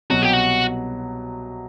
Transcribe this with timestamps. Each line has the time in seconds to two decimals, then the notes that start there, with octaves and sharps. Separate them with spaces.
0.10 C2 B2 F#3 F#4
0.22 G4
0.33 F#4